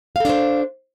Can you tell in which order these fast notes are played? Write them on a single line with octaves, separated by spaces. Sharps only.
F5 A4 D4 C5